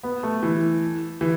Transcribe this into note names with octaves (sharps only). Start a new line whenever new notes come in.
B3
A3
E3
E3